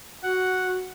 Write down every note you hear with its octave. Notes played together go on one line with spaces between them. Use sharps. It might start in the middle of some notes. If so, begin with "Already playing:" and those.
F#4 F#5